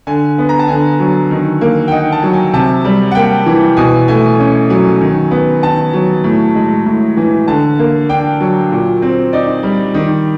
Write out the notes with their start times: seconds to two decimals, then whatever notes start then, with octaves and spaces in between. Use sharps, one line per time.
0.07 D3 G#5
0.38 B3
0.49 A#5
0.59 A5
0.68 D3 G#5
0.99 F#3
1.31 D#3
1.61 A#3
1.88 G5
1.91 D#4 F#5
2.12 A5
2.23 F#3
2.33 G#5
2.53 C3 A5
2.85 G3
3.11 F#5
3.15 A#3 G5
3.46 E3
3.77 B2 G#5
4.08 A3 G#5
4.39 C#4
4.70 F#3
5.01 D#3
5.31 B3
5.63 D#3 A5
5.93 F#3
6.24 A2
6.55 G#3
6.86 A2
7.17 E3
7.48 D3 A5
7.79 A#3
8.09 D4 G5
8.41 F#3
8.72 A#2
9.02 C4
9.33 D#4 D5
9.63 G3
9.94 D#3